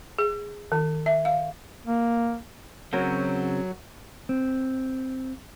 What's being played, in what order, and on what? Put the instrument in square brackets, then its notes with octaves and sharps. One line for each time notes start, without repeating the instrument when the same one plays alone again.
[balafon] G#4
D#3
E5
F5
[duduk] A#3
[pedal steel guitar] C#3 C4 [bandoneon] F#3 [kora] F#4 A#4 C#5
[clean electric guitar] C4